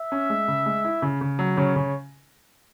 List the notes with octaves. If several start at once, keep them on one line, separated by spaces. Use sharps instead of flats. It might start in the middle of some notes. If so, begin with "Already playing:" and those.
Already playing: E5
C#4
G#3
C#3
G#3
E4
C#3
C#3
F#3
C#3 C#5
C#3